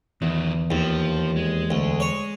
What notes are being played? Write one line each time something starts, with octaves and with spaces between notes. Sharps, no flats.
E2 D#3 F#3
D#2 F3
G#3
D2
C#5